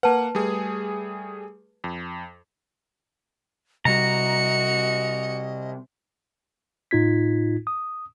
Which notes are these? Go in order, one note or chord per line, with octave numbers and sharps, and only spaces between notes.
A#3 B4 F#5 A5
G3 A3 G#4
F2
C3 G3 F#4 D#5 A#5 C#7
A2 D#4 F4 G#6 B6
D#6